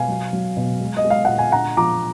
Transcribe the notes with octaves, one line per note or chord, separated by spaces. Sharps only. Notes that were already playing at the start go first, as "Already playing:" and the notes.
Already playing: B2 F5 G#5
F#3
F#3
B2
G#3
D#5
G#3
F5
A#2 F#5
G#5
D3 F#5 A#5
F3 A#5 D6